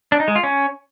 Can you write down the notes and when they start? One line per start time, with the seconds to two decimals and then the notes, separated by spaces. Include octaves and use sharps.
0.12 D4
0.20 D#4
0.28 G#3
0.36 F4
0.43 C#4